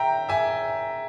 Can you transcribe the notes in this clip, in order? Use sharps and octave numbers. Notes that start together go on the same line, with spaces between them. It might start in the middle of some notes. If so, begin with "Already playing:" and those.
Already playing: E5 G5 A#5
E5 G#5